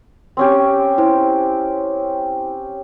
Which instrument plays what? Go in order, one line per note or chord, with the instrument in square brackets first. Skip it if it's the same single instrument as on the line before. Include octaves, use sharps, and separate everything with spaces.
[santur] C4 C#4 G4
[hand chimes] E4 C5